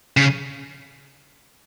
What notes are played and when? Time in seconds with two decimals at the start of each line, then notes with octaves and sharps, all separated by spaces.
0.17 C#3